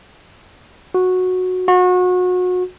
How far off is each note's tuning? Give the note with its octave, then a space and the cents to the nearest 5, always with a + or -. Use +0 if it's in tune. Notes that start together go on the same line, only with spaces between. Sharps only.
F#4 -10
F#4 -30